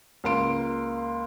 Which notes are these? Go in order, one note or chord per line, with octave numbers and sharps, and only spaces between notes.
C#2 A#3 F5 C6 D7